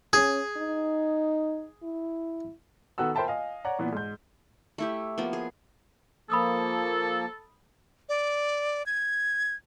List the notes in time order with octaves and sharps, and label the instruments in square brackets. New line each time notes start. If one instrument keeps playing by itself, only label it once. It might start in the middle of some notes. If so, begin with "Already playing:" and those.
[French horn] C#4 [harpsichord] G#4
[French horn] D#4
E4
[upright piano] D#3 B3 F#4 A4 E6
A#4 C5 E5 G5 A5 B5
D#5 F5 G#5
C#5 D5 F#5 A#5
A#2 E3 B3
G#2 G6
[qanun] A3 E4 G4
F3 A#3 B3
G#4
[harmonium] F3 A#3 [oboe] A4 [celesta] B5 D#6 E6
[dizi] D5
G#6